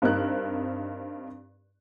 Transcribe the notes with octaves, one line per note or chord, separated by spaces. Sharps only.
G2 C4 D#4 A#4 F#6